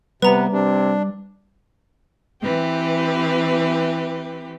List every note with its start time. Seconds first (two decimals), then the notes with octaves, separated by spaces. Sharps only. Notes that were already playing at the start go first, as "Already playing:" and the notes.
0.22 C3 G3 B3 B4 A#5
0.53 C3 D4
2.41 E3 C4 G4 B4